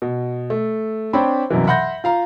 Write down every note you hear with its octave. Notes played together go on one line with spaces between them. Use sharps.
B2
A3
C4 D4 C5 C#5 B5
C2 F#2 B2 E3
E5 F#5 B5 C6 G6 A#6
F4 F5 A#5